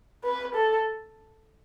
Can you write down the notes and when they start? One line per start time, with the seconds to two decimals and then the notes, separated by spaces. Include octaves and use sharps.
0.24 B4
0.55 A4